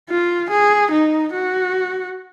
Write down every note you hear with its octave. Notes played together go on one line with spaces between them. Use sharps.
F4
G#4
D#4
F#4